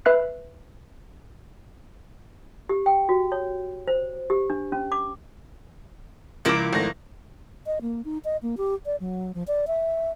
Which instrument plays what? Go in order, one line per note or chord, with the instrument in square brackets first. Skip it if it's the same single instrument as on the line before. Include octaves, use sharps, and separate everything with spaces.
[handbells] B4 E5 F#6 C7
[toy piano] G4
G5
F#4
C#5
C5
G4
D4
C#4
D6
[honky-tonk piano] C#2 D6 [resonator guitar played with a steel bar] F3 E4 A#4
[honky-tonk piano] G#1 A3 A#6
[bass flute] D#5
A#3
D#4
D#5
A#3
G4
D5
F#3
F3
D5
E5